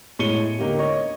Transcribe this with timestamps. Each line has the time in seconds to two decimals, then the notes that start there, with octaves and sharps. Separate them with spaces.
0.19 A2 G#3 C#5 C#7 D#7 G7
0.59 D3 A#3 D#4 G4
0.79 C#5 D#5 C#6